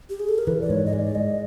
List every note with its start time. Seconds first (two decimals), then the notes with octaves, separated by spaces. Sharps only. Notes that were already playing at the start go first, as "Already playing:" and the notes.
0.10 G4
0.20 G#4
0.29 A4
0.38 A#4
0.47 E3 B4
0.61 D5
0.69 G#2 C#5
0.86 D#5
0.93 G#3 D5
1.15 G#3 D#5